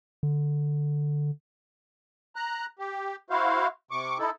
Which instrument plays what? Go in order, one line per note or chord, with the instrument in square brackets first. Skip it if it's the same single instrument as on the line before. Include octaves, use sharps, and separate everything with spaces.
[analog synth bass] D3
[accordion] A#5 F#6
G4
E4 F#4 C5 F5
C3 C#6 D6
D#4 E4 A4